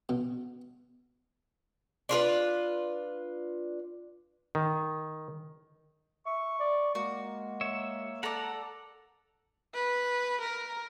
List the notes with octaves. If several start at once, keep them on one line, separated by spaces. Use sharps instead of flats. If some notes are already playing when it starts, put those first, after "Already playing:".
B2
D4 F4 A#4 B4
D#3
E5 C#6
D5
G#3 A#3 F#4
C#5 E5
A4 D5 F#5 A#5
B4
A#4